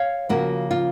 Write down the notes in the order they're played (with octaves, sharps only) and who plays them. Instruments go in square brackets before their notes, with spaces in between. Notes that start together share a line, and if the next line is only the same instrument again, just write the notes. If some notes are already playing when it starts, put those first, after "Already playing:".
Already playing: [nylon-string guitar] C#5 F5
C#3 F3 A#3 C#4 F#4
F4